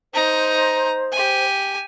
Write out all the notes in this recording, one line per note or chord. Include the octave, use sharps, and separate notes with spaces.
D#4 C5 A#5
G4 G#5